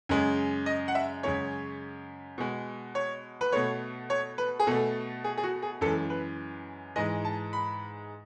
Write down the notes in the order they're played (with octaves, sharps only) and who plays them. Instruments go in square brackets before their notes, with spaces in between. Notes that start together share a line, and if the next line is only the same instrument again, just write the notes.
[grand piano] F#2 C#3 G#3
D#5
F#5
E5
F#2 C#3 G#3 C#5
B2 G#3
C#5
B4
B2 A3 C#5
C#5
B4
G#4
B2 A3 A4
G#4
G#4
F#4
G#4
F#2 E3 G#3 A4
B4
G#2 E3 G#3 D#5
A5
B5